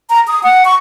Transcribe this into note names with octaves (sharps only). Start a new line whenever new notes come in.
A#5
D#6
F#5
C#6